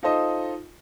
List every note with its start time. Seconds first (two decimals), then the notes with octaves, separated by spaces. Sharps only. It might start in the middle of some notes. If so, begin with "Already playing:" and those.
0.03 D#4 F4 A4 C5 D#5